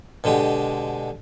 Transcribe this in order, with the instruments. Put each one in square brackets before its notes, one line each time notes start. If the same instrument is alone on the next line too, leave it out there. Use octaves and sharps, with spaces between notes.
[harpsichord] B2 D3 G#3 G4